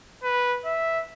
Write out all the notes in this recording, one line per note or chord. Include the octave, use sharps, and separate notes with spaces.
B4
E5